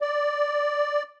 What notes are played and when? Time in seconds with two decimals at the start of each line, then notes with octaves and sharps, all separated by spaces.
0.01 D5